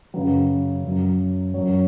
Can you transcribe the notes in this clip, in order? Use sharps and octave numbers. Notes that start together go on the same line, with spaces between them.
F#2 C#3 F#3 B4
F#2 F#3
F#2 F#3 C#5